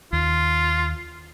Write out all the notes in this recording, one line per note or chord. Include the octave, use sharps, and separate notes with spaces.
D#2 F4